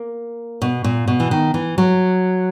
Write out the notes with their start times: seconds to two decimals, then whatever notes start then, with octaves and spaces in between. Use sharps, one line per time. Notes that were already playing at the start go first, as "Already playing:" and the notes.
Already playing: A#3
0.62 B2
0.84 A#2
1.08 B2
1.20 E3
1.31 D#3
1.54 E3
1.78 F#3